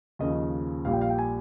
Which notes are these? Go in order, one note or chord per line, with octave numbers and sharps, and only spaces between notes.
D#2 C#3 F3 D#5
A#1 A#2 G3 F5
G5
F5
G5
G#5